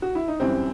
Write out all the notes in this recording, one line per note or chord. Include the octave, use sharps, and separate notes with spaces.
F#4
E4
D#4
F#2 E3 G3 C4